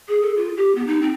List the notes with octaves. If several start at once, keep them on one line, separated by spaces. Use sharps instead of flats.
G#4
A4
F4
G4
B3
D#4
C4